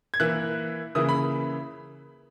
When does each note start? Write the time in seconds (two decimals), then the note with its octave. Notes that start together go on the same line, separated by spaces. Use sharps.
0.14 G#6
0.20 E3 A#3 E4 F#6
0.95 C#3 E3 A#3 E4 D#6
1.09 B5